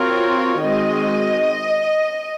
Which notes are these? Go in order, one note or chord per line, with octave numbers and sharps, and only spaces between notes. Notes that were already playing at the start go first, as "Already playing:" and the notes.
Already playing: C4 F4 F#4 A#4 C#5
D#3 G#3 C4 F#4 D#5